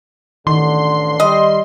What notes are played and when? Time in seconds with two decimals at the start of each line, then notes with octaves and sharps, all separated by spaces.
0.47 A1 D3 D#3 C6
1.20 G3 D#5